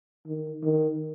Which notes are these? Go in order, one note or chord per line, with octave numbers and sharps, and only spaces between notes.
D#3
D#3